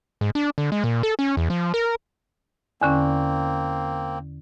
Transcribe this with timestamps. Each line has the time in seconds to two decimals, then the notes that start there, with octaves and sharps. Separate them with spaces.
0.21 G#2
0.35 D4
0.58 D3
0.72 G#3
0.84 A#2
1.03 A4
1.19 C#4
1.37 E2
1.50 F3
1.74 A#4
2.82 E2 D3 A#3 C4 C#4